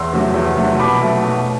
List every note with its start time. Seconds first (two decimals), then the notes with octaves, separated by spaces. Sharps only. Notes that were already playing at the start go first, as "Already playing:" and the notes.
Already playing: E2 C6 E6
0.13 C3 F#3 A3
0.34 E2
0.57 C3 F#3 A3
0.79 B2 B5 D6
1.02 F#3 A3
1.24 B2